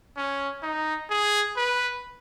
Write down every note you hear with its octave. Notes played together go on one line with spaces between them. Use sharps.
C#4
D#4
G#4
B4